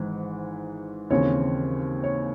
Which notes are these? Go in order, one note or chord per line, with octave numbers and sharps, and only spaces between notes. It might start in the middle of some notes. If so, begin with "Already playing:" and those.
Already playing: G#1 G#2 E3
D#2 C#3 E3 C4 C#5
C#5